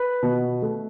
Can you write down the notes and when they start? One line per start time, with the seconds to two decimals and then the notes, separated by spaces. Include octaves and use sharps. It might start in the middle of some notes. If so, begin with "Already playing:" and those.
Already playing: B4
0.23 B2
0.62 A3